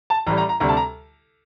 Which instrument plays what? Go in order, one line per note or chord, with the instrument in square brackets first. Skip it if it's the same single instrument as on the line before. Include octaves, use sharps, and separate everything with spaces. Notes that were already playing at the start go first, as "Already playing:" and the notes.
[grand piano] A5
A1 A2 G3 A#5
A#5
A#5
D2 C3 G3 A#5
A5
A#5